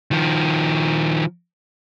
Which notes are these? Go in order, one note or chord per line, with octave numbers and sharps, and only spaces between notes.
D#3 F3